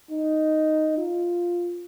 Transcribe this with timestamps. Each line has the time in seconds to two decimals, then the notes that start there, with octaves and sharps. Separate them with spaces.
0.10 D#4
0.97 F4